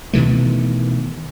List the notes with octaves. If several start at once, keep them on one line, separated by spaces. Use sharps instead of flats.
B2 D#3 E3 A3